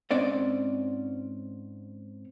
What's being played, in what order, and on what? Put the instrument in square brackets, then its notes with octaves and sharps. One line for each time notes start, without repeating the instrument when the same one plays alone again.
[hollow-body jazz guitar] G#2 C4 C#4 D5 D#5